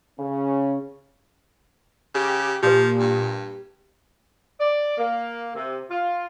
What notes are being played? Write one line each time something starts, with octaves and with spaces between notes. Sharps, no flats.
C#3 C#4
C#3 G4
A#2 F3 G4 B4
G2
D5
A#3
C3
F4